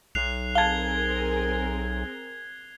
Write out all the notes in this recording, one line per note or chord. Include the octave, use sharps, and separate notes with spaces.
B1 F#6 C7 F7
C4 G#4 A#4 F5 A5 G#6 G7